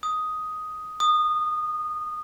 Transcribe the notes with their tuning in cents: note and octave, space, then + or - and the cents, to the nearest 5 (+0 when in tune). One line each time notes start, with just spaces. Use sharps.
D#6 +5
D#6 -20